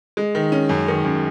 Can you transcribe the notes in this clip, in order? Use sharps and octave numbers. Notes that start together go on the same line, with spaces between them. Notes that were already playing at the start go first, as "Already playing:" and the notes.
G#3
D#3
C#4
F#2
D#3
F#2